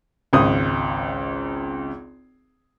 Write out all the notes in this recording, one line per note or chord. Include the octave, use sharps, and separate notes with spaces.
G#1 C#2 D#6